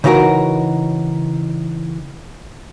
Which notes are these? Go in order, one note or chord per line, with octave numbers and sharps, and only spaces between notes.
C#3 E3 D#4 F#4 A#4